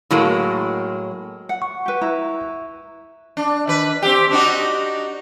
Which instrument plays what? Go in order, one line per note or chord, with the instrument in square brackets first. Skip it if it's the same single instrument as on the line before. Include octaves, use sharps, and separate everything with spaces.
[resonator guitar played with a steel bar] A2 F#3 G#3 A#3
[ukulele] F#5
[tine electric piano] C#6
[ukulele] G4 B4
E4 A#5
[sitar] D4
D#3 B4
C4 G4
D4 D#4 F#4